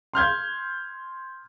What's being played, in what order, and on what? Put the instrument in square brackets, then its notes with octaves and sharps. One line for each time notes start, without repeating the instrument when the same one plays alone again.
[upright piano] C6 F6 G6 G#6